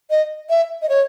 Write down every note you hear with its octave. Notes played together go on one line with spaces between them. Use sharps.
D#5
E5
D#5
C#5